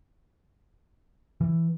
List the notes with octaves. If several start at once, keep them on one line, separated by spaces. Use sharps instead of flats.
E3